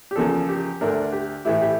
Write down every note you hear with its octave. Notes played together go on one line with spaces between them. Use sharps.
G4
E2 C#3 F3 A#3 A4
G4
D2 D3 A3 D4 A#4
G4
A2 E3 A3 E4 G4
G4